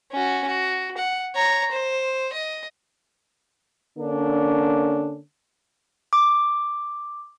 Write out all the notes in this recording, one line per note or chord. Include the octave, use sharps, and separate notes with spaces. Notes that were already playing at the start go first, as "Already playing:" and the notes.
C#4 F#4
F#4
F#5
C#5 A#5
C5
D#5
D3 A#3 C#4 D4
D6